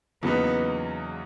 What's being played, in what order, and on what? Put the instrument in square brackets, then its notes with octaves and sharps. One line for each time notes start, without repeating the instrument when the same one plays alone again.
[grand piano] E2 C#3 F#3 A#3 D#4 [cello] B3